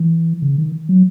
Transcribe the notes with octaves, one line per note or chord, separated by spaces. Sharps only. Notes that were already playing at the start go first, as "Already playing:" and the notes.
Already playing: E3
C#3
D#3
F#3